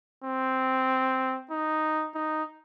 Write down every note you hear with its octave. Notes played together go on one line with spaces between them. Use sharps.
C4
D#4
D#4